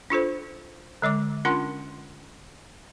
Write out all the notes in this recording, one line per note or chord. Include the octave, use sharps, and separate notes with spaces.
D4 F4 A4 C5
D3 G#3 D5 D6
C#4 D4 F4 A#4 F#5 C6